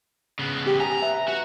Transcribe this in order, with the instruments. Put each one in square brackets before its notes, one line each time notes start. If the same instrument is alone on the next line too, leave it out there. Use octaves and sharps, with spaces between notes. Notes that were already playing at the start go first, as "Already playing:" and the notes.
[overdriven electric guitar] C#3 B3
[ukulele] G4
[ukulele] G#5 [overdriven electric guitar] A#5
[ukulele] B4 E5
[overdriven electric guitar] F#4